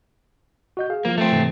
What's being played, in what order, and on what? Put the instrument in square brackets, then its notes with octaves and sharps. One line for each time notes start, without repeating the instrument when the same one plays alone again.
[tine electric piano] F#4 D#5 G6
G#4 F5
[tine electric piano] F3 F4 [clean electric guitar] A#3
[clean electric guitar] A3 C4
[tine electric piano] G#2 C3 E3